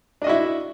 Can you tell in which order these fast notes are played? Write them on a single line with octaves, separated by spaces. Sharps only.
D4 D#5 F#4 E4